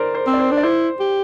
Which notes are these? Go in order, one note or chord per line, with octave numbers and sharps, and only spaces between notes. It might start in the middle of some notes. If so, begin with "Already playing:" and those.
Already playing: A#4 C5 D5
C5
C4
D5
C5
D4
D5
E4 C5
G4